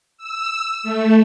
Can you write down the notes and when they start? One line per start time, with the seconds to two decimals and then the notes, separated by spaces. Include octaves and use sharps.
0.18 E6
0.83 A3